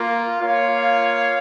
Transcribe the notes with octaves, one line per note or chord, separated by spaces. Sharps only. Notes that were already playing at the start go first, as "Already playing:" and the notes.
Already playing: A#3 F4
A#3 F4 C#5 F5